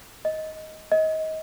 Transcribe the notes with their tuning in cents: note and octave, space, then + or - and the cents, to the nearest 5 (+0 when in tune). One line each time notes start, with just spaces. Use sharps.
D#5 +10
D#5 +25